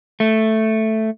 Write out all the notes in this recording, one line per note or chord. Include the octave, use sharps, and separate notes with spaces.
A3